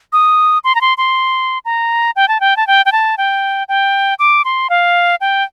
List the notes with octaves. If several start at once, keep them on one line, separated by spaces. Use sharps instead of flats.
D#6
C6
A#5
C6
C6
A#5
G5
A5
G5
A5
G5
G5
A5
G5
G5
D6
C6
F5
G5